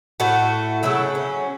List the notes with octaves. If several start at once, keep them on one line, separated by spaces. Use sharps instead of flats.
A2 A3 F#4
C#3 F#3 A3 E4
C#4